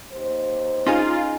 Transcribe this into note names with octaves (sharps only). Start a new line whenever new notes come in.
D#2 C5
C#4 D#4 F4 G#4